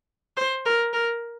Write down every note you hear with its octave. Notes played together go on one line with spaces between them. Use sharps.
C5
A#4
A#4